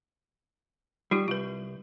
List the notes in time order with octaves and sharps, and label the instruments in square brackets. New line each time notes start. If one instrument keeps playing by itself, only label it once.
[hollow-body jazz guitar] G3 [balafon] D#4 F4 G4
[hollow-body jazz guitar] C2 [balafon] F4 B4